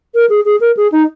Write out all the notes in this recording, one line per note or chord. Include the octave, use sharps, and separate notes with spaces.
A#4
G#4
G#4
A#4
G#4
D#4